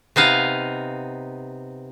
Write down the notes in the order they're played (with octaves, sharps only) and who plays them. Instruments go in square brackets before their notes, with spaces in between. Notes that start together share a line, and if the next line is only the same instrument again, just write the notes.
[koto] C3 B3 D#4 F5